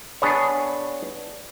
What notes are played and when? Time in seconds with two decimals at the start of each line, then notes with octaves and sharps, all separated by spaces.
0.22 B3 D4 G#4 B4 C#5